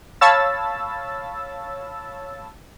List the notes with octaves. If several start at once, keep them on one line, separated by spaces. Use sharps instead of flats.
C#5 F5 A5 B5 E6 A6